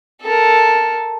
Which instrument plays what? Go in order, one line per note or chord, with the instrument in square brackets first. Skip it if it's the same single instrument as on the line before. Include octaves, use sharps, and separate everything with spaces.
[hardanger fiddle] A4 A#4